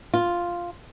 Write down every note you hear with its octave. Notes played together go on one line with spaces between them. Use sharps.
F4